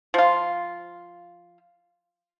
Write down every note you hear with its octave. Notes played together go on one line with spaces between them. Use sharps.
F3 F4